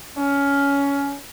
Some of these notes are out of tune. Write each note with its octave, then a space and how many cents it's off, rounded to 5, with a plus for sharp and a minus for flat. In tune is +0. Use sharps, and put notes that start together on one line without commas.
C#4 +20